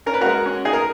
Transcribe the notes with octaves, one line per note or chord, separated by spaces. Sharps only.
C#4 A#4
B4
G#3 F#4 A#4
C#4
D#4 G#4
A#4